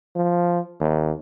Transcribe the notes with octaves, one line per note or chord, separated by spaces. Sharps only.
F3
D#2